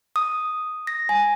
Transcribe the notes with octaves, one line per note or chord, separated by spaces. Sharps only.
D#6
A#6
G#5